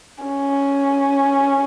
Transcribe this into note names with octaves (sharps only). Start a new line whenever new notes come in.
C#4